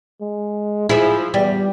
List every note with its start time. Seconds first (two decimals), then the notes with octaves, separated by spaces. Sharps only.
0.21 G#3
0.89 F3 E4 G#4
1.34 E2 G3